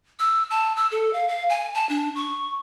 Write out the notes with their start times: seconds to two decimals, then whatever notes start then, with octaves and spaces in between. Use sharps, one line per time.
0.19 E6
0.50 A5
0.76 E6
0.91 A4
1.13 F5
1.28 F5
1.50 G#5
1.75 A5
1.89 D4
2.15 C#6